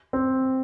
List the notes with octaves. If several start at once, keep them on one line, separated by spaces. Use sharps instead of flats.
C4